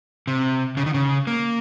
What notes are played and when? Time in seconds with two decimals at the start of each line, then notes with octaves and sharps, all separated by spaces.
0.27 C3
0.77 C#3
0.86 D#3
0.94 C#3
1.27 A#3